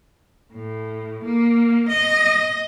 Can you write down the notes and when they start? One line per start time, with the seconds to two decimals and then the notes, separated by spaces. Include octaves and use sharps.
0.54 A2
1.24 A#3
1.87 D#5